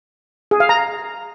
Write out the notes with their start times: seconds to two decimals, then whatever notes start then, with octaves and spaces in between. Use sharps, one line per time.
0.51 G#4
0.60 F5
0.69 A#5